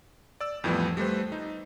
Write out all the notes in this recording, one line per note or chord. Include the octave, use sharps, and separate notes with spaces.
D5 E6
F2 A2 E3 F3 G3 B3
G3 A3 B4 C5
D#4